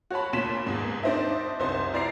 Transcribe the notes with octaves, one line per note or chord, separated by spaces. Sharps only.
F#4 C#5 A5 B5
D2 A#2 C#4 C6 B6 E7
G1 D#2 G#2
C4 D4 D#4 C5 D#5 E5
C2 F#2 C5 C6
F1 E4 D5 A#5 C7